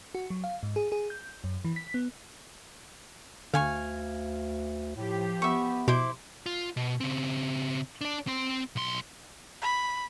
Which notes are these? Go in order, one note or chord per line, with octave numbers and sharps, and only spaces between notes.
F#4
F#3
F5
G#2
G#4
G#4
G6
F#2
E3
B6
B3
D2 D3 F5 G#5 C#6
A2 F3 G4
B3 E5 C#6
B2 E4 C5 D6
F4
B2
C#3 C4
D4 D5
C4 C6
B1 C6
B5